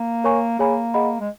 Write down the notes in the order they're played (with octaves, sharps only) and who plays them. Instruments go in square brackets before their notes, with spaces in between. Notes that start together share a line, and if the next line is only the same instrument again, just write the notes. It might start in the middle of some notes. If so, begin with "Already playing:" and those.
Already playing: [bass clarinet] A#3
[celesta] A#4 C#5 G#5 C#6
[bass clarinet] A#3 [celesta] G#4 C#5 G#5 B5
[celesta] G#4 D#5 F#5 B5
[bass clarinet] G#3